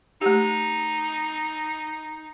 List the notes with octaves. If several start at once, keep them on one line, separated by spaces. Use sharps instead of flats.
A3 D#4 G4